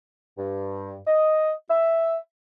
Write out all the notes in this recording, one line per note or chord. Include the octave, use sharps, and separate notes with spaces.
G2
D#5
E5